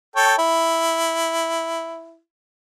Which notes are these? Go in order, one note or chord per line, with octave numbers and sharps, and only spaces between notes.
A4 C#5 G5
E4